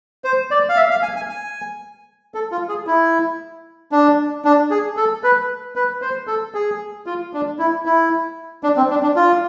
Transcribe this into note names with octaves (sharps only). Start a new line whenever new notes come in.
C5
D5
F5
E5
F5
G#5
G#5
G#5
A4
F4
G#4
E4
D4
D4
G#4
A4
B4
B4
C5
A4
G#4
F4
D4
E4
E4
D4
C4
D4
D4
F4